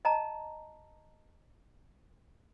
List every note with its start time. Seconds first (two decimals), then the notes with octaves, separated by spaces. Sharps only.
0.05 D#5 A5 A#5